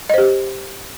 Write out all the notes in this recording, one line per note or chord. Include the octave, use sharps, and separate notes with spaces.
G4 C5 D#5